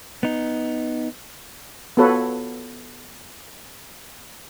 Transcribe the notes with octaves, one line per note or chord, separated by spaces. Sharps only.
B3 D#4
B3 F4 F#4 A4 B4 C#5